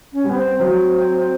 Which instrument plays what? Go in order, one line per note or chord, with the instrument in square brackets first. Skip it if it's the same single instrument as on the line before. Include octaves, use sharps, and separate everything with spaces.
[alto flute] C#4
[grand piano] G3
[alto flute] B3
C4
[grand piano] F#3 [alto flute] C4